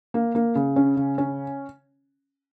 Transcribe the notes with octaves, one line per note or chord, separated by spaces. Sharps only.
A#3
A#3
C#3
C#4
C#3
C#4